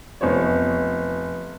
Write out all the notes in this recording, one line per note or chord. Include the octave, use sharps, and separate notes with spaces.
F1 B3 C5 C#5